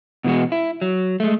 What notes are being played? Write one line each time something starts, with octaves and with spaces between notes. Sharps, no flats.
B2 E3 G#3 F#4
E4
F#3
G#3 A3